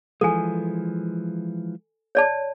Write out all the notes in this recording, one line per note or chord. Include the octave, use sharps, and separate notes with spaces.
E3 F3 G#3 A4 G#5
C#5 D5 A5